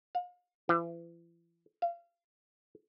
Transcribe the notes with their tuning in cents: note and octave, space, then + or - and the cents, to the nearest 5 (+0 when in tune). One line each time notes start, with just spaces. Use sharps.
F5 +40
E3 +40
F5 -25